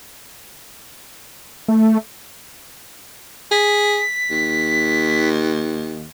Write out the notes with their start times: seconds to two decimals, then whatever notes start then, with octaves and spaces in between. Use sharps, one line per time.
1.68 A3
3.52 G#4 B6
4.30 D#2